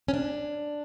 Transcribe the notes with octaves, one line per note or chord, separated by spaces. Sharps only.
C#4
D4